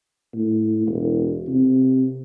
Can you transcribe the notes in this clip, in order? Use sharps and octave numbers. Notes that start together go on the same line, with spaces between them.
A2
E1
C3